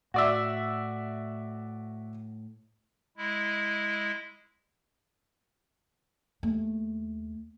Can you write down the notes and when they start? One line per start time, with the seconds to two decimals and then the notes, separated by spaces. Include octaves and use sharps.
0.14 A2 F#4 D5 E5
3.17 G#3 E4
6.43 D#2 A3